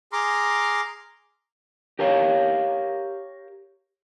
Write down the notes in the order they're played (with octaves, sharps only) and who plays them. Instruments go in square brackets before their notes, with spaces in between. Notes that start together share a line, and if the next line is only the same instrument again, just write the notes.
[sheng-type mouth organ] G#4 A#5 C6 D6 F6
[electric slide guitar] G4 A#4 C#5 F5